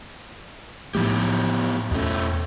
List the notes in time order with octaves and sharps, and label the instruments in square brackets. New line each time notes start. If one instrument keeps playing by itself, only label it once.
[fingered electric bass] A2 F3 A3 [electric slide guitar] B3 E4 G4
[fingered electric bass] E2 C#4 [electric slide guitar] B2 A3